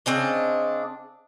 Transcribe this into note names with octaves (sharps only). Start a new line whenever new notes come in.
C#3 C4 D4 D#5